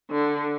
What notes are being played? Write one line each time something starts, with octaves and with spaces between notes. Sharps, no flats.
D3